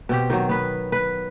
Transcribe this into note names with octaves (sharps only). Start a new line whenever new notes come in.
B2 C4 G4
D#3 F#3
B3 B4
B4